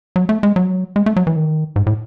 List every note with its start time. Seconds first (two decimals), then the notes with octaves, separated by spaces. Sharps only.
0.16 F#3
0.29 A3
0.43 G#3
0.56 F#3
0.96 G#3
1.06 A3
1.16 F#3
1.27 E3
1.36 D#3
1.76 G#2
1.87 A2